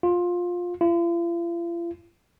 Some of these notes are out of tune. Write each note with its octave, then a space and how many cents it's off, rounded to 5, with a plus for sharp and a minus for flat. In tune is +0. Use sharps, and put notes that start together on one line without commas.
F4 +15
F4 -45